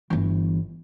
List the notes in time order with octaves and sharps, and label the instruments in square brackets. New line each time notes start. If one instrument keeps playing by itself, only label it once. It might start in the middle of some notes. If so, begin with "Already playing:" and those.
[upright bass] G1 E3